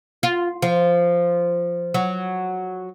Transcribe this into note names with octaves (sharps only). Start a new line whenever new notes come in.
F4
F3
F#3